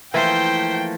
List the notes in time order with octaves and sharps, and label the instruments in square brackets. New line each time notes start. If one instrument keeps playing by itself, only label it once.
[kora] E3 [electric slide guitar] F3 A3 A#3 [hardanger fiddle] C5 [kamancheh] G5